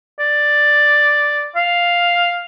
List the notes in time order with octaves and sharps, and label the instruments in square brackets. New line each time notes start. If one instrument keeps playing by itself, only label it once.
[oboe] D5
F5